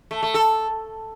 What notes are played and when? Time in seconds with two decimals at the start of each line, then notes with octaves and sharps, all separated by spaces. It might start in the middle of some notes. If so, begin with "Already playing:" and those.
0.11 A3
0.23 A3
0.34 A4